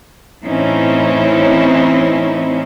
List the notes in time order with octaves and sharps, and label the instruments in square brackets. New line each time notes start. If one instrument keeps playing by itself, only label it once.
[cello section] A2 E3 C4 C#4 D#4 E4